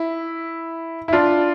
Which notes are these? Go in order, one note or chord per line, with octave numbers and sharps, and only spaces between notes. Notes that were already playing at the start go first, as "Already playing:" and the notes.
Already playing: E4
E4
D4 F4